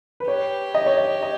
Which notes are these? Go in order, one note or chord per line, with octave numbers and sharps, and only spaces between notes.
B4
G4 C#5
D#5
C#5
D#5
D#5